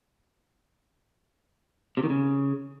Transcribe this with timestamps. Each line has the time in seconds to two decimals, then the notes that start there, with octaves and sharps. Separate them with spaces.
1.97 C3
2.04 D#3
2.10 C#3